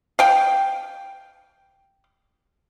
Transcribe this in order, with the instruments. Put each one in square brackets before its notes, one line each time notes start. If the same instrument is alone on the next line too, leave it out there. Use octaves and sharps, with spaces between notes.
[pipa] F5 G5